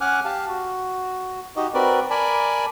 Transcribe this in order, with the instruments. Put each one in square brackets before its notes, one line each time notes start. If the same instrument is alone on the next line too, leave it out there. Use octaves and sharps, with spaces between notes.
[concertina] C#4 F#5 G#5 D6 F6 F#6
G4 F5 A5
F#4
D#4 F#4 G4 D#5
C4 F#4 A#4 B4 D5
A#4 D5 G#5 A5 B5